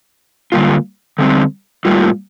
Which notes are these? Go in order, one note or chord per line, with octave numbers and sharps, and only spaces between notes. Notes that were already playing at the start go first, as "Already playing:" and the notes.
D3 G3 A#3 F4
D3 G3 C4
A2 G3 A#3 F4